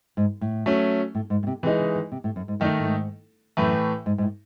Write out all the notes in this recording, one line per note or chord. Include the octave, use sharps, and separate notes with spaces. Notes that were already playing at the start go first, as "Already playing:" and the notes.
G#2
A2
F#3 A3 C#4
A2
G#2
A2
C3
C3 E3 G#3 D#4
C#3
D#3
C3
A2
F#2
G#2
F#2 D#3 A3 D#4
A2
G#2
F#2 A2 E3 A3
G#2
G#2
A2